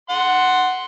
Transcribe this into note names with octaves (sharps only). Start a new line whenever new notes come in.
F#5 C6